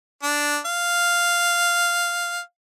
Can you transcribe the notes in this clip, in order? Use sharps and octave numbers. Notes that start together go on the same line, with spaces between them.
D4
F5